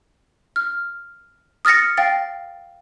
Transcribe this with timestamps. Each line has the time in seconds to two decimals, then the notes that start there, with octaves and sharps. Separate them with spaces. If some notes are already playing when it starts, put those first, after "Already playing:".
0.56 F6
1.65 D#6 F6 A6 A#6 C#7
1.97 F5 G5 A6